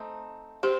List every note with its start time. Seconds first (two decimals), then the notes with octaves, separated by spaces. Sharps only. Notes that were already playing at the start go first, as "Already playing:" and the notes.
Already playing: A3 C4 D#4
0.63 C4 G4